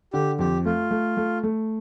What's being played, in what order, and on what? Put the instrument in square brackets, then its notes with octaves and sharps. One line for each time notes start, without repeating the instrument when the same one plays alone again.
[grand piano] D3 [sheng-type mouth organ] G4
[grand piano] F2 [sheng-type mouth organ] G4
[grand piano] A3 [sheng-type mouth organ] F4
[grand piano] A3
A3
A3